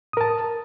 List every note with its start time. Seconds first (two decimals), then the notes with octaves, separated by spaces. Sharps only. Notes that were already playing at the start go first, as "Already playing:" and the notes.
0.13 D#6
0.17 A#4
0.21 A5